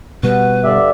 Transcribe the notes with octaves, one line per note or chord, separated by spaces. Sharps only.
B2 G3 F#4 B4
G2 D3 G4 D5 E5 F5